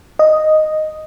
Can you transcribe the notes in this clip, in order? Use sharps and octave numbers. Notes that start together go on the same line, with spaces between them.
D#5